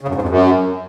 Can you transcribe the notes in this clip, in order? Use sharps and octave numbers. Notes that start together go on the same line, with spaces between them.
C#3
F#2
G#2
F2
F#2